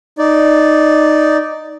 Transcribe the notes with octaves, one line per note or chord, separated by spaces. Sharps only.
D#4 D5